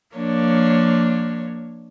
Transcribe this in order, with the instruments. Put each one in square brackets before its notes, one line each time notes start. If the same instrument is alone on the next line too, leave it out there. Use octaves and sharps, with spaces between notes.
[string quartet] F3 A#3 D4 C#5